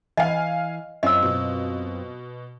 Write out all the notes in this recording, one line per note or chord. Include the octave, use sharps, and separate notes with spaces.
E3 D#5 F5 G#5
F#2 C4 C#4 F4 D#5 E6
B2